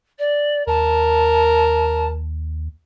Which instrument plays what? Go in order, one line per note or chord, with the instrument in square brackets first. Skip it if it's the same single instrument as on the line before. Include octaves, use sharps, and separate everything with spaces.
[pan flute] D5
[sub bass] D#2 [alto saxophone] A#4 [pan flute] A5